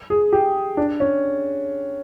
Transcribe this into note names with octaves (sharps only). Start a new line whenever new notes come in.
G#4
G4
D4
C#4